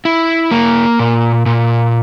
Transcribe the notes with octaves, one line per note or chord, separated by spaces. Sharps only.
E4
A#3
A#2
A#2